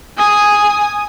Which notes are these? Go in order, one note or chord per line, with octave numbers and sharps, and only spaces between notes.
G#5 D#6